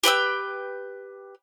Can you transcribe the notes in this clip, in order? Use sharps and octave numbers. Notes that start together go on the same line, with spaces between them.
G4 B4 G5 E6